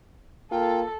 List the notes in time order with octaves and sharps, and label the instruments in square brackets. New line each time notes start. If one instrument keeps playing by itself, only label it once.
[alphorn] A#3 [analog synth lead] F4 [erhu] A4 [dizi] G5